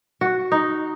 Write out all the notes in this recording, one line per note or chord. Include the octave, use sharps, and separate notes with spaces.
F#4
D#4